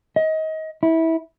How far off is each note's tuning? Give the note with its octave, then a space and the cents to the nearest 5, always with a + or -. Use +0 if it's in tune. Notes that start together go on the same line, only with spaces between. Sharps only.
D#5 +25
E4 -20